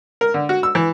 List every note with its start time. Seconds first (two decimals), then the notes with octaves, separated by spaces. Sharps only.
0.21 A#4
0.34 D3
0.49 F#4
0.63 E6
0.75 E3